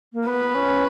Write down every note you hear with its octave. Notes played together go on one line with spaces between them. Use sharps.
A#3
B3 B4
C#4